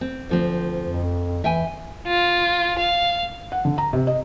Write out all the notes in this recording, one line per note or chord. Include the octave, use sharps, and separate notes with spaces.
C4
D2 F3 C4
F2
E3 E5 G5 G#5
F4
F5
F#5
D3
A#5
C3
D#5